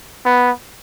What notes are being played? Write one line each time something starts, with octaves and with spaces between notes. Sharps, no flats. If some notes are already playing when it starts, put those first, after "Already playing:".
B3